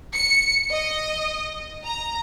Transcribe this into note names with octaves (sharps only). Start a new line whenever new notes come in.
C#7
D#5
A#5